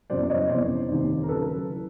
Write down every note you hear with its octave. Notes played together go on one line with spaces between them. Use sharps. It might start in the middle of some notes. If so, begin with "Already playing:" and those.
F#1 E2 C#3 F#3 C5 D5
D5
C#5 D#5
F1 E2 C#3 C5 D5
F1 D#2 D#3
A#4
D#2 C#3 F#3 A4 B4
E3